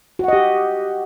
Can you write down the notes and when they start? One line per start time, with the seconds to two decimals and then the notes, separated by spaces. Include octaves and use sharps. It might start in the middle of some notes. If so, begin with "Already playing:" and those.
0.19 F#4
0.24 F#5
0.28 D#5
0.33 G4